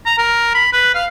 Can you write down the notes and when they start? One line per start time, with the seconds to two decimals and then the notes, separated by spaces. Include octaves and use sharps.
0.06 A#5
0.18 A#4
0.54 B5
0.73 B4
0.95 F5